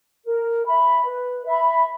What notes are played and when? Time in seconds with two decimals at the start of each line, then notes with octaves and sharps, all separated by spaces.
0.24 A#4
0.64 E5 B5
1.05 B4
1.45 E5 B5